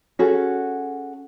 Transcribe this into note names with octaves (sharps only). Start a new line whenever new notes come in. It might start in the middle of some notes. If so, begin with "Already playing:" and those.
C#4 F#4 G#4 A4